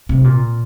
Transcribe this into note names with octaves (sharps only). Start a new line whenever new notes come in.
C3
A#2